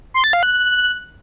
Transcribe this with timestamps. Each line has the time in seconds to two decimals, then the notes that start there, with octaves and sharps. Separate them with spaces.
0.14 C6
0.24 A6
0.33 F5
0.43 F#6